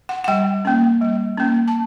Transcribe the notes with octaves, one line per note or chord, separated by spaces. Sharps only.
F#5
F#5
G3 G5
A#3 C#4
G3
A#3 C#4
A5